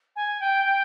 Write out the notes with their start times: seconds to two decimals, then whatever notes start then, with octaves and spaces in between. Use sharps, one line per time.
0.16 G#5
0.40 G5
0.65 G5